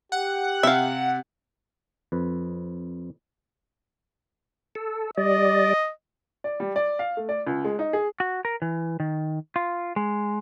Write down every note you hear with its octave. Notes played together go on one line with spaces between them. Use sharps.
G4 F#5
C3 E5 F5
F2 B4
A4
G3 D5 D#5
D5
G3
D5
F5
A3
D5
C#2
G#3
D#4
G#4
F#4
A#4
E3
D#3
F4
G#3